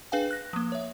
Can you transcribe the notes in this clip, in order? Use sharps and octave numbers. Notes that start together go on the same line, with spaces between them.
D4 G#4 B4 F5 G5 G#5
F#6 A#6
F3 A#3
C#5 E5